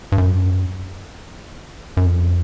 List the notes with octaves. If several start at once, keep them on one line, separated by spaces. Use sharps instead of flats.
G2
F#2
F#2
F2